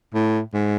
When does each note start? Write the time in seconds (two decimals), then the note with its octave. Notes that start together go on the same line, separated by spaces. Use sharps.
0.14 A2
0.53 G#2